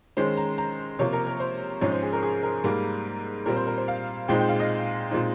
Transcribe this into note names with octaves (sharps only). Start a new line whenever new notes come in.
D#3 G#3 C#4 C5
A#5
A#5
C3 F3 A#3 C#5
A#4
A#4
C5
G#2 F3 G#3 C#4 C#5
C5
G#4
A#4
G#4
A#4
G#2 G3 A#3
A#2 G3 C4 A#4
C5
A#4
C5
F5
A#2 G#3 C4 D#4 G5
G5
F5
D#5
A#2 G#3 C4 D#4